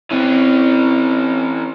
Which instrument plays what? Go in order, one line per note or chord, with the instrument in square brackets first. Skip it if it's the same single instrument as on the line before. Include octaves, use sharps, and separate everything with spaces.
[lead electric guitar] E3 C#4 [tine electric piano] C4 E4